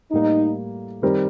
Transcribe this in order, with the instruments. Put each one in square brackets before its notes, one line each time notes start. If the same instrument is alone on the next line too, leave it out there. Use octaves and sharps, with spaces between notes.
[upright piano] A2 G3 A#3 [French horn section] D#4
[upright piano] D#3 G3 C4 G4 A#4